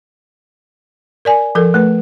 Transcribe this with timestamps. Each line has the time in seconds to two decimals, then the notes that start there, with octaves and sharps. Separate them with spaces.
1.25 A#4 D5 G#5
1.55 F3 A4 A#4
1.74 A3 B4